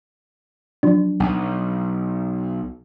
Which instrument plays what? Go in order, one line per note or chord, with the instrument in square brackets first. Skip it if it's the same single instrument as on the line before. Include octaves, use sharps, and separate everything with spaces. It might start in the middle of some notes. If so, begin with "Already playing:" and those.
[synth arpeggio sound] F3 F#3 D4
[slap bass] B1